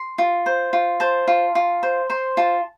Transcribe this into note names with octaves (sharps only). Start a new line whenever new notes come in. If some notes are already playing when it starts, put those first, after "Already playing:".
Already playing: C6
F4
C5
F4
C5 A5
F4
F4
C5
C5 C6
F4 A5